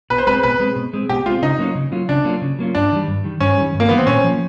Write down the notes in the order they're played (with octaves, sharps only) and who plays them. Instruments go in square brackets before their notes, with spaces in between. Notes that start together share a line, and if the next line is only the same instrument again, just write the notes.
[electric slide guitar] B2 [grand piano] B4
[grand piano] C5
[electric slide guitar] G#3 C4 [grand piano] B4
[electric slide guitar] B2 [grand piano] B4
[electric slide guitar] G#3 C4
B2
G#3 C4
[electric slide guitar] B2 [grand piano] G4
[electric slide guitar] G#3 [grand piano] F4
[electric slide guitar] C4
[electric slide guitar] C#3 [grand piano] D#4
[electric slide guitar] F#3 A#3 C#4 F4
C#3
F#3 A#3 C#4 F4
[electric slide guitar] C#3 [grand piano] D4
[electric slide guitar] F#3 A#3 C#4 F4
C#3
F#3 A#3 C#4 F4
[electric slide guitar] G2 [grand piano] D4
[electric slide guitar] D#3 G3
G2
D#3 G3
[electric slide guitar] G2 [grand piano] C#4
[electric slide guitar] D#3 G3
G2
[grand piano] A#3
[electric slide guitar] D#3 G3 [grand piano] B3
[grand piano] C4
[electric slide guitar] A#2 [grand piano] C#4
[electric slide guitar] F3 A#3